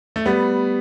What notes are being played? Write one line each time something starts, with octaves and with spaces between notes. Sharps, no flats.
A3
G3 B3